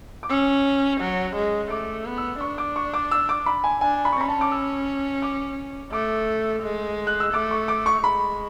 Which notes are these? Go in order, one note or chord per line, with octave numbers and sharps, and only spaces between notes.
D6
C#4 E6
F#3
G#3
A3 D6
B3
E6
D4 C#6
D6
C#6
D6
E6
D6
B5
G#5
D4 G#5
B5
C#6
C#4 B5
A5
D6
E6
D6
A3 D6
G#3
F#6
E6
A3 D6
C#6
D6
C#6
G#3 B5